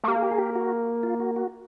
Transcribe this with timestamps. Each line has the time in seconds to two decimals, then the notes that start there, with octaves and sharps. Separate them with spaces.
0.04 A3
0.07 A#3 G4
0.16 G#4
0.23 G4
0.31 G#4
0.38 G4
0.56 F#4
1.03 F4
1.20 F#4
1.36 F#4